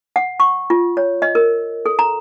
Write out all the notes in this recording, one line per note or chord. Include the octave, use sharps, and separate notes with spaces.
F#5
C#6
F4
C#5
D#5
A#4
A4
A#5